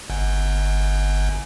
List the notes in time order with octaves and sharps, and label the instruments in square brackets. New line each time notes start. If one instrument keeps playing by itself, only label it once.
[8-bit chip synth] G1